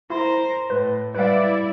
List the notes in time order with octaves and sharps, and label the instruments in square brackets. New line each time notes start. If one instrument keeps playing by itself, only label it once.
[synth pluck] E4 [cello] A#4 C5
[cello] A2 [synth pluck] B4
[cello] G3 [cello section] E4 D5 [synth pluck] B4 F5